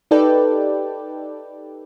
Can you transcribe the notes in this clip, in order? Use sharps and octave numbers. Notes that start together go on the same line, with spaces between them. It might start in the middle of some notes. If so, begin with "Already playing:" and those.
D#4 G4 A4 B4 D5 G5